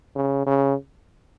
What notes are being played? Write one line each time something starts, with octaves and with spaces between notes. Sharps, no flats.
C#3
C#3